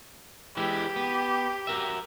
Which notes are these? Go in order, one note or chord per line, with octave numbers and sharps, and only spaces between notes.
E3 G#3 E4 G4
B3
F#4 A#4 E5